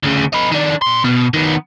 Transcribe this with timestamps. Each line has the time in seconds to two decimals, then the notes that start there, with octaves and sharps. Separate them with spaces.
0.04 D2 C#3
0.33 D#4 B4
0.51 D#3 D4
0.82 A#2 C6
1.04 B2
1.34 D#3 B3